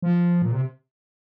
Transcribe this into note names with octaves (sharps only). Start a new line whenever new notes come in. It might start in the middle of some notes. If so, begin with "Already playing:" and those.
F3
A#2
C3